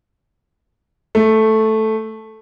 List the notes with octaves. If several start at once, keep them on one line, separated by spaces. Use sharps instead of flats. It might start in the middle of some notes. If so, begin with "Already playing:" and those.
A3